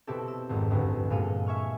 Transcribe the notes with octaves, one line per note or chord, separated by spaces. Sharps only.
B2 C4 E4 G4 A4
E6
G#1 F2 G#2
A1 D2 G2
G2 A#2 G#3 A4 F5 D#7
E5 G#5 C#6 F6